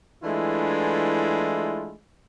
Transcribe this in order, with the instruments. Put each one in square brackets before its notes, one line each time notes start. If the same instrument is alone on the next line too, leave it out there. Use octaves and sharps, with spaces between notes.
[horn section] E3 G#3 A3 D4 E4 F4